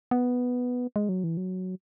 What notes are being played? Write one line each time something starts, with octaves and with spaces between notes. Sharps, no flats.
B3
G#3
F#3
E3
F#3